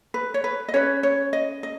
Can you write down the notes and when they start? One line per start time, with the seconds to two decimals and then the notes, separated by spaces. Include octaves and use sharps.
0.14 B4
0.34 C#5
0.44 B4
0.68 D#5
0.74 C#4 B4 C#5
1.03 C#5
1.33 D#5
1.63 D#5